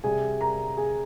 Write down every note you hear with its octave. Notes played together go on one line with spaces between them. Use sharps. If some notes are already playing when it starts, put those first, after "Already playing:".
C3 G3 D4 G#4 G#5
A#4 A#5
G#4 G#5